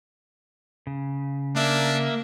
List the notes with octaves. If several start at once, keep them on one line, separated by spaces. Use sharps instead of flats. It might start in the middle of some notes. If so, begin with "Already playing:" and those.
C#3
A#3 D4 E5